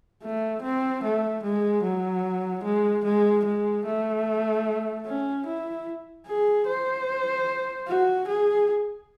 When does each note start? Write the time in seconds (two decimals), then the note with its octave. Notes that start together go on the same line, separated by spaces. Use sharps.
0.23 A3
0.62 C4
1.04 A3
1.44 G#3
1.83 F#3
2.64 G#3
3.05 G#3
3.45 G#3
3.86 A3
5.06 C#4
5.47 E4
6.27 G#4
6.67 C5
7.88 F#4
8.28 G#4